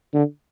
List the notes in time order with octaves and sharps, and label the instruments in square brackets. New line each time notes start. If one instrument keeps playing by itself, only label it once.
[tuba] D3